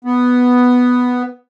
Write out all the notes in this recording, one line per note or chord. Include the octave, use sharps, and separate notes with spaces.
B3